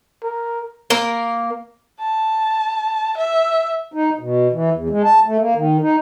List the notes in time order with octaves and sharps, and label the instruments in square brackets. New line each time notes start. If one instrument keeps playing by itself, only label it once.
[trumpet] A#4
[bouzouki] A#3 A#4
[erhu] A5
E5
[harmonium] D#4
B2
E3
E2
G#3
A5
A3
A#3
D#3
D#4